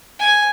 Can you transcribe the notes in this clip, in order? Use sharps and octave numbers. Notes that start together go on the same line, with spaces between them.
G#5